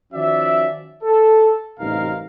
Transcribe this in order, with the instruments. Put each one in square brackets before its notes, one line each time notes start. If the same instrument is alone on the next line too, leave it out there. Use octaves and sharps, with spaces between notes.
[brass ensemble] D#3 F3 C#4 F#4 D5 E5
A4
A1 G2 C3 D#4 A#4 F5